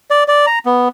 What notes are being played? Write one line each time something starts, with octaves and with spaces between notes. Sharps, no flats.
D5
D5
A#5
B3